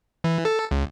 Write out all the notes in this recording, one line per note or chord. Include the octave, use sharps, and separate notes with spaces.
E3
A4
C#2